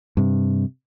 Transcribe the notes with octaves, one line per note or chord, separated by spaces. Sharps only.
G2 C3